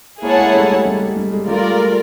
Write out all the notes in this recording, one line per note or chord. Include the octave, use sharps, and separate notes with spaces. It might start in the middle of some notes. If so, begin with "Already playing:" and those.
G#3 A#3 E4 G#4 C#5 F#5 A5
G#3 A#3
G3 A3
G#3
G3
G#3
G3
G#3
G3 A3 F4 A#4 D5
G#3